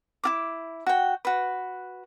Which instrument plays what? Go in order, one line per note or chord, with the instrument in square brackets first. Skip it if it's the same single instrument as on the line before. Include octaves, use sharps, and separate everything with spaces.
[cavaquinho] E4 F4 D6
F#4 G5
F#4 B4